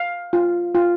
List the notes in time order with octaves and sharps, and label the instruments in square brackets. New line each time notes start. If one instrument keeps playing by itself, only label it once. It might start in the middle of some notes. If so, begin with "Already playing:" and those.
Already playing: [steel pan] F5
F4
F4